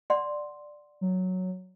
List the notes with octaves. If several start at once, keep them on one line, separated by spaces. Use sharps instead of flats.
D5 F#5 C6
F#3